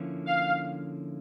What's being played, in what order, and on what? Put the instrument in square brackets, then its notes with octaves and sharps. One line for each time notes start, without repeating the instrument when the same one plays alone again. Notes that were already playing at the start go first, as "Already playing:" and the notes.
Already playing: [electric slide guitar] D3 F3 A#3 C#4 E4
[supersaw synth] F5